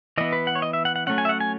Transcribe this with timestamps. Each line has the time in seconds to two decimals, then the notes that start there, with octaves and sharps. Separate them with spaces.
0.18 E3 B3 D#5
0.32 B4
0.47 F#5
0.55 C#5
0.62 D#5
0.73 E5
0.85 F#5
0.96 F#5
1.07 F#3 A3 C#4 F#5
1.18 G#5
1.25 E5
1.29 F#5
1.40 G#5